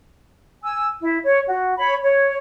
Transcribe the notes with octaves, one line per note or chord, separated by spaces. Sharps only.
G#5 E6
E4
C#5
F#4
C#5 B5
C#5